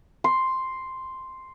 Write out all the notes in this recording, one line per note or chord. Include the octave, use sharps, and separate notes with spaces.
C6